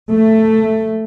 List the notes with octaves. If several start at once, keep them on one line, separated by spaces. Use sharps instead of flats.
A3